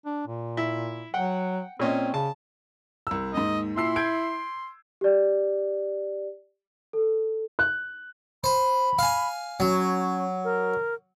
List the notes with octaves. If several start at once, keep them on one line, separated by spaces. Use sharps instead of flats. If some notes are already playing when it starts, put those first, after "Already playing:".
D4
A#2
E4
F#3 F#5 G5
A#2 C4 C#4 D#5
C#3 A5
C2 E6
D#2 G#2 D#5
A#2 E4 C6 E6 C7
G6 G#6 D7
G4 D5
A4
F#6
C5 B5
F5 G#5
F#3 C#4
A#4